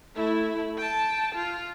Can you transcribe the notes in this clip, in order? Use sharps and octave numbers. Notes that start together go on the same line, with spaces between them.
A3 E4
G5 A5
F4